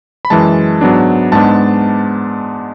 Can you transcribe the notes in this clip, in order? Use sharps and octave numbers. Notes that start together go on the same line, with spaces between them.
B5
F#2 E3 G#3 A5
G#2 F#3 B3 D4
G#2 G#3 B3 D4 A5